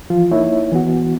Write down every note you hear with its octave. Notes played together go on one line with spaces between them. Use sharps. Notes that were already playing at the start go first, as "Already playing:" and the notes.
E3 F3 F4
A#3 D#4 E4 C#5 E5
E3 B3 F#4